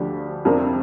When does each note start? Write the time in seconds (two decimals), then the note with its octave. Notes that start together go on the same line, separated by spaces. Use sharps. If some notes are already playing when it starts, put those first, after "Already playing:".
Already playing: D2 D3 F3 D4 G4
0.45 F2 C3 F3 D4 A#4